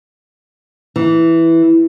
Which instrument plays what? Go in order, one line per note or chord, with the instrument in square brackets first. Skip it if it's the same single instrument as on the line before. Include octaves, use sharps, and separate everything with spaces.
[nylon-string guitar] E3